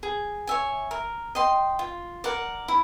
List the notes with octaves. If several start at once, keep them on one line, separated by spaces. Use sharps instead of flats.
G#4
C#5 E5 G#5
A#4
D#5 G5 C6
F4
A#4 D5 F#5
E4